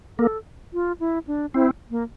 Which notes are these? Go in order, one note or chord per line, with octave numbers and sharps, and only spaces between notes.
A#3 A4
F4
E4
D4
C4 E4
A#3